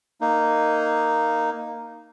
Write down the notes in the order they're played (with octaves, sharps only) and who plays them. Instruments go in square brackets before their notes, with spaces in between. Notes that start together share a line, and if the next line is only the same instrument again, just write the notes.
[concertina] A#3 D#4